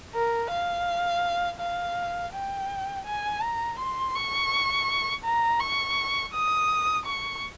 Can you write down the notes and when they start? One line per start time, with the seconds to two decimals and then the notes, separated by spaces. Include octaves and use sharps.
0.15 A#4
0.51 F5
1.60 F5
2.33 G5
3.06 G#5
3.42 A#5
3.79 C6
4.16 C#6
5.25 A#5
5.61 C#6
6.34 D#6
7.06 C#6